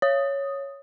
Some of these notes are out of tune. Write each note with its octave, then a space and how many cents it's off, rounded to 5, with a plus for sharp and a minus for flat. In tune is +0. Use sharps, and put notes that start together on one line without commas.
C#5 +0 D#6 +0